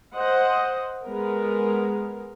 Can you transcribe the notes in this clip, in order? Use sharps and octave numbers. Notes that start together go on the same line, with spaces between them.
C5 D#5 F#5
G#3 B3 A#4